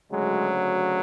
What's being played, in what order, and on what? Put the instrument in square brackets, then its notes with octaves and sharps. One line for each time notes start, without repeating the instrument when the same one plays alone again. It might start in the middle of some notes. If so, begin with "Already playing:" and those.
[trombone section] D2 C#3 F#3 G#3